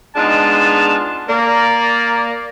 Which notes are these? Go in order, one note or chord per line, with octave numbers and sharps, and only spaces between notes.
G#2 G#3 B3 D4 F4 A5
A#3 D5